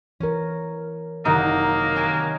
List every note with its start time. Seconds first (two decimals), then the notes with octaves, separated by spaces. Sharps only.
0.20 E3 C#4 A#4
1.25 F#1 C3 D#3 A#3 D#4 F#5
1.95 C#4 G5 G#5